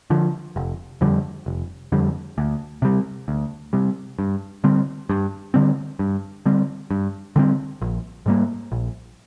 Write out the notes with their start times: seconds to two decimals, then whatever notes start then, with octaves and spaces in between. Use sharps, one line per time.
0.10 D3 F3
0.56 F1
1.01 F2 D3 G3
1.46 F1
1.92 F2 D3 G3
2.38 D2
2.82 C3 G3
3.28 D2
3.73 C3 G3
4.19 G2
4.64 D3 G3 C4
5.09 G2
5.54 D3 G3 C4
5.99 G2
6.46 D3 G3 C4
6.91 G2
7.36 D3 G3 C4
7.82 A#1
8.26 G#2 G3 A#3
8.72 A#1